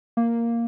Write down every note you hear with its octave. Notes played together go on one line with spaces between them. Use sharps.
A#3